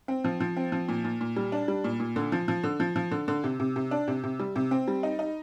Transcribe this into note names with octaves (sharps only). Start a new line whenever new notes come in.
C4
F3
F3
C4
F3
A#2
A#2
A#2
G3
D4
G3
A#2
A#2
D3
F3
F3
D3
F3
F3
D3
D3
C3
C3
C3
D4
C3
C3
G3
C3
C4
G3
D#4
D#4